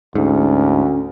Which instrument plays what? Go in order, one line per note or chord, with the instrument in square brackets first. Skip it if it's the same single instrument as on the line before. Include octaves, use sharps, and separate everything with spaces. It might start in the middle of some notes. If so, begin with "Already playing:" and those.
[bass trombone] D2 [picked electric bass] G#2 [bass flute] C#4